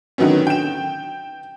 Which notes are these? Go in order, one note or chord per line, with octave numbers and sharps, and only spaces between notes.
D3 D#3 F#3 B3 C#4
G5 E7